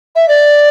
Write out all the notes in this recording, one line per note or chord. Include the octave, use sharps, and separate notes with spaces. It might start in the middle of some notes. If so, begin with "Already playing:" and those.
E5
D5